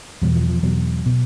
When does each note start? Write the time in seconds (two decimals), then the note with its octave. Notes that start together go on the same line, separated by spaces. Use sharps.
0.22 E2 B2 G3
0.36 F3
0.49 F3
0.63 E2 B2 F#3
1.06 B2